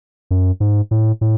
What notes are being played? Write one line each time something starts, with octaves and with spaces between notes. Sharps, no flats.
F#2
G#2
A2
A2